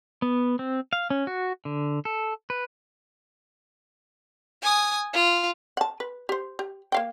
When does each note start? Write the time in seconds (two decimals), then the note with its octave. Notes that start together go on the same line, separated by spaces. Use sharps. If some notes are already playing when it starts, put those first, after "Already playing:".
0.22 B3
0.59 C4
0.93 F5
1.10 C#4
1.27 F#4
1.65 D3
2.05 A4
2.50 B4
4.63 G#5 D#6
5.13 F4
5.77 F#5 A5
6.00 B4
6.29 G4 C5
6.59 G4
6.92 A#3 F5 G5